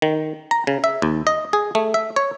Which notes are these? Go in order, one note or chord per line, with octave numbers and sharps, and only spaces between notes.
D#3
A#5
C#3
E5
D#2
D#5
G#4
A3
E5
C#5